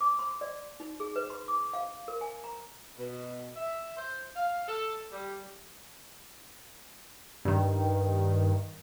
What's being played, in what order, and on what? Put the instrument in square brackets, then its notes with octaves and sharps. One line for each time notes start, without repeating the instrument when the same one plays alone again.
[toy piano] D6
C6
D5
D#4
G#4
B4
C6
D6
F5
A#4
G#5
A#5
[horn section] B2
E5
C5
F5
A4
G3
[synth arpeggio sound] G2 D#3